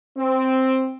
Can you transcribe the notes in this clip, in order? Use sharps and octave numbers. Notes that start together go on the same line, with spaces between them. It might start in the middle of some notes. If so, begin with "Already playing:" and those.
C4